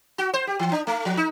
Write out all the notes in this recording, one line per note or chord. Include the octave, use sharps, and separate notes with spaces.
F#4
C5
G4
E3
D4
A3
F3
D#4